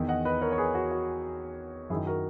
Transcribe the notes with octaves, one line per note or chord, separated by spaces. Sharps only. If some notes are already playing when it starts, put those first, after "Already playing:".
Already playing: E2 D#3
D#5 F#5
B4 D#5
A#4 C#5
C#5
G#4 B4
F#4
F#4
F#2 D#3 E4 G#4
F#4 A#4